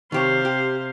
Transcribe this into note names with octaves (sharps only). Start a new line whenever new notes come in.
C3 D#3 G4 C5 C#5 F5
G4